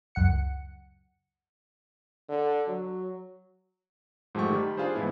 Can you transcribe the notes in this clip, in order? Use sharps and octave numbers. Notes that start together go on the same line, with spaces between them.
C#2 F#2 F#5 C#7
D3
F#3
G#2 F3 A3 G4 C#6
D#3 G3
D4 F4 G#4 C5
G#2 E3 B3 E4